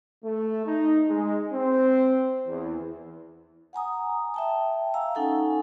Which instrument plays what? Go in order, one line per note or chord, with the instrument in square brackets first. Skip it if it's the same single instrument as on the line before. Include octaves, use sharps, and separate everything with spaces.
[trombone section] A3
D#4
G#3
C4
E2
[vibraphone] F#5 G#5 A#5 D#6
E5 G5 A5
F5 G#5 A#5 E6
C#4 D#4 A4 F#5 G#5